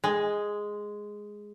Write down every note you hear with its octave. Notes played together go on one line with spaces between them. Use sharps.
G#3